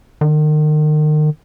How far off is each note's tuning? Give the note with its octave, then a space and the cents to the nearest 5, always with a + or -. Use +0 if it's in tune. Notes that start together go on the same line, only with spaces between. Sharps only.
D#3 -35